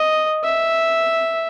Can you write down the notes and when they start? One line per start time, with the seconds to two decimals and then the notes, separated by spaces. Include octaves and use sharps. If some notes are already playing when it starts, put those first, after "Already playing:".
Already playing: D#5
0.44 E5